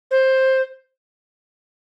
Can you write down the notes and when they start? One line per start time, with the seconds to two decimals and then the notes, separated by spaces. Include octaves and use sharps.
0.11 C5